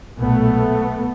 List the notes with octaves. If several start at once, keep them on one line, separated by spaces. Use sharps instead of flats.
B1 A#2 A3 B3